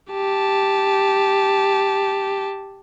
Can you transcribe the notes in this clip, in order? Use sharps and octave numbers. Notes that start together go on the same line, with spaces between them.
G4 A5